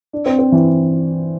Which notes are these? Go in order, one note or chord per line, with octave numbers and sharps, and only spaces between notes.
D4
C4
C4
E3